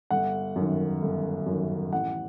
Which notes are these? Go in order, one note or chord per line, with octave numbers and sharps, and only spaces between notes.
G1 F#5
F#2 D#3
G1
F#2 D#3
A1 F#5